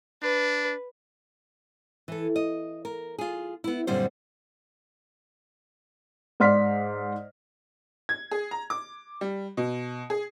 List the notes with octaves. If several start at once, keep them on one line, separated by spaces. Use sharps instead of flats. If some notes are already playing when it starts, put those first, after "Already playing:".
D4 B4
E3 A4
D#5
A#4
F4 G#4
B3 E4
F#2 A#2 D3 G3 C4 C5
G#2 D5 C6 F6 B6
G#6
G#4
A#5
D6
G3
B2
G#4